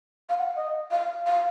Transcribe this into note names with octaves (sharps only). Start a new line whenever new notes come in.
F5
F#5
F5
D#5
F5
F5